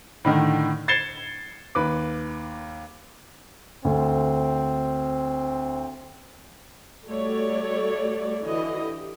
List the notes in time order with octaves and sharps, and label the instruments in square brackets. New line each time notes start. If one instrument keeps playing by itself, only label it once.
[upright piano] A2 D3 D#3
G#6 A6 C7 C#7 E7 G7
D#2 B4 D6
[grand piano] D2 [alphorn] C4
[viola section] G3 A3 F#4 A4 C#5 D5
D3 E3 F#4 D#5
G4